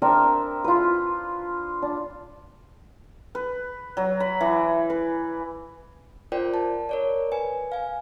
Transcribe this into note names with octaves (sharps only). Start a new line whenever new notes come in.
C4 D4 A#4 E5
F4 B4
D4
B4
F#3
B5
E3
B4
F4 A#4 C5 D5 G5
A5
A#4 C#5 D5
B4 G#5
F5 G#5